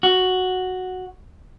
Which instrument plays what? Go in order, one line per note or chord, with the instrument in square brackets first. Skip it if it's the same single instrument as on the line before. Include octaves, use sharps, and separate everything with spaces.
[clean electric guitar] F#4